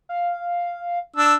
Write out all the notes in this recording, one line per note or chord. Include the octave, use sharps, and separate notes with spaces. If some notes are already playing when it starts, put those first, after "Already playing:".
F5
D4 E6